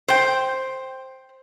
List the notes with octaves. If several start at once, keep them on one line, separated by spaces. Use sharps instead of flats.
C5 G5